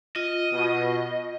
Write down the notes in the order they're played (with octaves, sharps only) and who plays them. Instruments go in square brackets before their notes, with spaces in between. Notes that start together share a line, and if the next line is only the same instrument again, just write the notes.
[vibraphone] F4 [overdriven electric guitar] D#5
[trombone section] B2